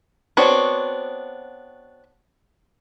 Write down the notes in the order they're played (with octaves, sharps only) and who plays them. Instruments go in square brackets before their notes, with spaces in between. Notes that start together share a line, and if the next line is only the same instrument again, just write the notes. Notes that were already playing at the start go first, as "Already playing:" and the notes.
[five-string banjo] B3 C4 D4 F#4 C#5